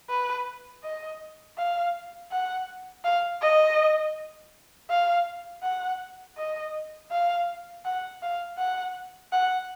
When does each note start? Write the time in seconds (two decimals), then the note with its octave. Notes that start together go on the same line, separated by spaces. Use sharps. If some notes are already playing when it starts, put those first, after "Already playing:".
0.10 B4
0.84 D#5
1.58 F5
2.32 F#5
3.05 F5
3.41 D#5
4.90 F5
5.63 F#5
6.37 D#5
7.12 F5
7.85 F#5
8.22 F5
8.58 F#5
9.32 F#5